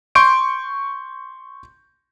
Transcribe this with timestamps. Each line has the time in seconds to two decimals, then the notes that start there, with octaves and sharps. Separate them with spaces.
0.15 C6 C#6 G6 D7